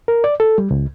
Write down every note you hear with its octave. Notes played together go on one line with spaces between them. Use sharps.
A#4
D5
A4
G3
C#2